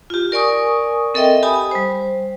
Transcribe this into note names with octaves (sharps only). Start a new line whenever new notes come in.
F4 G4
A#4 D5 G#5 C#6 D#6
C4 A4 A#4 D#5 E5 G5
G4 G#5 B5 D#6
G3 C5